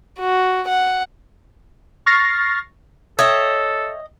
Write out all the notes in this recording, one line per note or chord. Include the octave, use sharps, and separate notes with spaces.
F#4
F#5
C#6 F6 A6 A#6 C7
A4 C#5 D#5 E5 G5